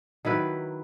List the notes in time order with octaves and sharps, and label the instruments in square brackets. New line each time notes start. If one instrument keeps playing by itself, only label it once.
[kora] D#3 F#3 E4 B4